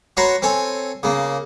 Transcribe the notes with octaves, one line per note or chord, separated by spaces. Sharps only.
F#4 B4 C#5 A#5 C6
C4 A4 C#5 G#5
C#3 A#3